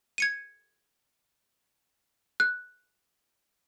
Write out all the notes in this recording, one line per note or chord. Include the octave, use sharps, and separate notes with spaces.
G#6 C#7 D#7
F#6